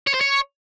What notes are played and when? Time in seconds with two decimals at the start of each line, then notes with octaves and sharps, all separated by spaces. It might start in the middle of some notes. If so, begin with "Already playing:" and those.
0.07 C#5
0.14 C5
0.21 C#5